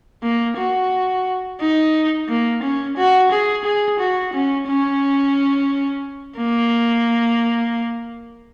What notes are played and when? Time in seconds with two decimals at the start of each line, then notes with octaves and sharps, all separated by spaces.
0.23 A#3
0.58 F#4
1.60 D#4
2.29 A#3
2.63 C#4
2.97 F#4
3.31 G#4
3.64 G#4
3.99 F#4
4.33 C#4
4.67 C#4
6.38 A#3